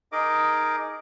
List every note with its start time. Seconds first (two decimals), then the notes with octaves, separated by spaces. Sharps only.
0.12 D#4 G#4 A#4 D#5 D6